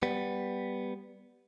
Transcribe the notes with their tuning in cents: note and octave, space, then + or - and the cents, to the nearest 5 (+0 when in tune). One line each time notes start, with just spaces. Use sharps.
G3 +0 B3 +0